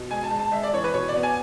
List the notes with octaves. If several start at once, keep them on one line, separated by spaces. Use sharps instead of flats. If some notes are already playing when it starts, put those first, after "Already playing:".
Already playing: B2
G#3 G#5
A5
G#3
A5
G#3 E5
D5
E3 C#5
B4
B2 C#5
D5
B3
G#5